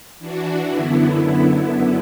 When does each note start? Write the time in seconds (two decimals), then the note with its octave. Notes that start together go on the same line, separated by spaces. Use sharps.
0.19 E3 D4 F#4
0.70 F#2 D3 B3 E4